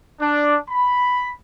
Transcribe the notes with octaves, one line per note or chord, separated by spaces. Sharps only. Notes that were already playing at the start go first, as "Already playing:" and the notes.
D4
B5